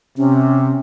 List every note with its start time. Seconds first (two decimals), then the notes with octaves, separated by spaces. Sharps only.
0.17 C3 C#4